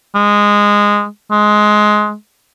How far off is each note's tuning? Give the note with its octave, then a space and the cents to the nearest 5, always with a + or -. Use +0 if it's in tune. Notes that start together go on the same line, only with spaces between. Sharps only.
G#3 -10
G#3 +15